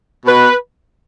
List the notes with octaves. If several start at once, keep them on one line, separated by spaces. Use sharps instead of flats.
B2 B4